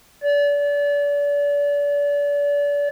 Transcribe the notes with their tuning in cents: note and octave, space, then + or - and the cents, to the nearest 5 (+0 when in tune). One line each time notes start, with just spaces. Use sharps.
D5 -35